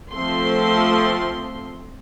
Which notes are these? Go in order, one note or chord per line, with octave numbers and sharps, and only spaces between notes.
F3 A3 C4 C6